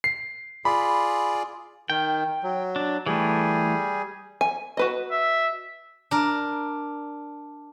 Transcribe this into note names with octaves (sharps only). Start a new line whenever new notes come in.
C7
F4 G#4 D5 B5
D#3 G5
F#3
D4
E3 G3 A3 G#4
G#5
F#4 B4 D#5
E5
D4 A#4